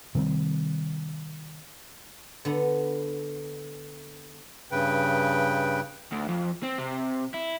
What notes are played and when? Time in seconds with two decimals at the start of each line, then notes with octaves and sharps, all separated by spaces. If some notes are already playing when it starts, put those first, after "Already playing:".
0.15 C3 D#3 G3 C4
2.45 D3 B3
4.71 G2 C#3 B4 G5
6.12 D2
6.28 F2
6.63 C4
6.78 C3
7.34 E4